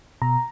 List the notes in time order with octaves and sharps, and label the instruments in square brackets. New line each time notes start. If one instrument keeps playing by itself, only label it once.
[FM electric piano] B2 A#5